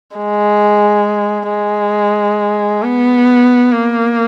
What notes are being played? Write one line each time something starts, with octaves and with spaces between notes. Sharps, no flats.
G#3
G#3
B3
A#3